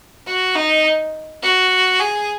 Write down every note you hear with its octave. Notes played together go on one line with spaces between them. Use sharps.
F#4
D#4
F#4
G#4